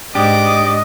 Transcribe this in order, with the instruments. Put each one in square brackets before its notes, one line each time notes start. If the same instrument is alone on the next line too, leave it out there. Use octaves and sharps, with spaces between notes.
[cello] G#2 [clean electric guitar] D4 G4 [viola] D#5 [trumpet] D6